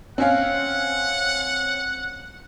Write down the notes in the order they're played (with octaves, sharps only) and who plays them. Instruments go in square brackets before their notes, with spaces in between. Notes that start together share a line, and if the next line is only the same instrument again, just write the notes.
[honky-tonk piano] C4 C#4 F5 [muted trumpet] F#5